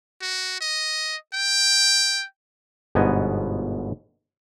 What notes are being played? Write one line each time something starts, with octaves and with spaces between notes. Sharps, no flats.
F#4
D#5
G5
G1 G#2 B2 B3 D#5 G#5